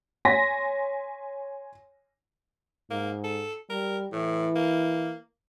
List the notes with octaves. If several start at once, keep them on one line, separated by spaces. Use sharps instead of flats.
C#5 G#5 C6 A#6 B6
G#2 A#3
A4
G3 A#4
A2 E3
A#3